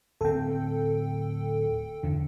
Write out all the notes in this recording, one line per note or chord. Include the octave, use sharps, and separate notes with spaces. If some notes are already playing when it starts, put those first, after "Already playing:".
D1 C4 A4 G5
E2 D3